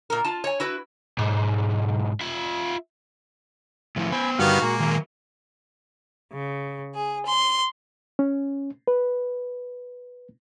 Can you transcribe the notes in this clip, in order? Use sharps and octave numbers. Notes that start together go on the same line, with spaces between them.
A#2 A#4
F4 A5
C#5 G#5
E4 F#4 B4
B1 G#2
F4 E5
A2 F3 E4
B3 C5 G#5 B5
G2 D3 D#3 G3 B3 F#4 F5
A#2 G#3 A#3
D#3 F#3
C#3
G#4
C6
C#4
B4